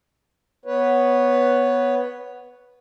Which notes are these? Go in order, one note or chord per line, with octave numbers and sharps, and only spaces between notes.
B3 B4 C#5